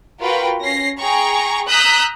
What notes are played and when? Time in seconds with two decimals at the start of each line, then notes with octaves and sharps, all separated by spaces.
0.20 F4 F#4 A#4 B4 G5
0.61 C#4 A#6 C7
1.00 G#4 G5 A#5 C#6
1.67 A#5 D#6 E6 F#6 G6 B6